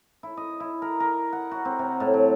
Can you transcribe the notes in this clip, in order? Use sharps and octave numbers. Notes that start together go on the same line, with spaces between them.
E4
D#5
E4
A#4
A#4
F#5
F#4
C4
C3
A2
F#3